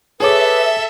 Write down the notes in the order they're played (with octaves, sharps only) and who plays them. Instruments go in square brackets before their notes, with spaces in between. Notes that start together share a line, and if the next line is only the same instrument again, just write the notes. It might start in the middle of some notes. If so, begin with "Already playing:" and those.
[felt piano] G#4 C#5 D6 [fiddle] A4 [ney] B4 [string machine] E5